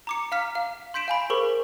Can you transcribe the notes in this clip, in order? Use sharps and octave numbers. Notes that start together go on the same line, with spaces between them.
A#5 D6 C#7
F5 A#5 F6 B6
F5
C6 G6 B6 D7 E7
F5 G#5 B5
G#4 A#4 C5 C#6